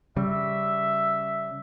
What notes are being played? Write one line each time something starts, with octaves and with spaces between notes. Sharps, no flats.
C#3 G3 E5